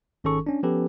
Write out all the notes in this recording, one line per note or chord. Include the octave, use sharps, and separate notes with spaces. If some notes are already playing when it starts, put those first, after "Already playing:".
G#1 D#3 C#4 G#4 A4 C#6
C#4 D4
F3 B3 C#4 G4 A4 B4